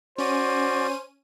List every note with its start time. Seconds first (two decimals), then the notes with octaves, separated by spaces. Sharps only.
0.18 C#4 F#4 C5 D5 D#7